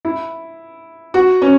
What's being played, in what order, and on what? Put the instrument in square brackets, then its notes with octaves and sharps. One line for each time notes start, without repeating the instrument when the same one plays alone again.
[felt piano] E4
F#4
C#4